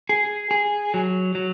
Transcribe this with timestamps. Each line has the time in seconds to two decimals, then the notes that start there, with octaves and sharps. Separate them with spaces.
0.09 G#4
0.51 G#4
0.94 F#3
1.35 F#3